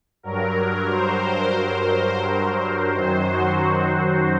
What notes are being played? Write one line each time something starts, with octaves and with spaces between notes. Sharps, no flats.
G2 F#3 A#4
A#4
C5
C5
F#2 D#3 F#3 C5
F#4